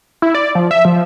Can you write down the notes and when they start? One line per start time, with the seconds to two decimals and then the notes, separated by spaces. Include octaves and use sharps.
0.22 E4
0.35 D5
0.55 F3
0.71 E5
0.85 F3